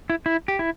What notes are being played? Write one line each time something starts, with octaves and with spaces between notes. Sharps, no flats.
E4
E4
G4
E4